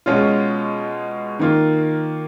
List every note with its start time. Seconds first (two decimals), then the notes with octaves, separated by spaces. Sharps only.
0.06 B2 G#3 C#4 F4
1.39 D#3 A#3 F4